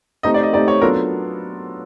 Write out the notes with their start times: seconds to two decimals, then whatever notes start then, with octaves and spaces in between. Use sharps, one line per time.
0.23 A3 C4 D#4 G4 D#5
0.34 D5
0.43 D#5
0.53 A3 C4 D#4 G4 D5
0.68 C#5
0.82 F#3 B3 D4 F4 A4 A#4